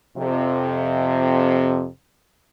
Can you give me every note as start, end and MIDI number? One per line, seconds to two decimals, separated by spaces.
0.16 1.86 41
0.16 1.86 48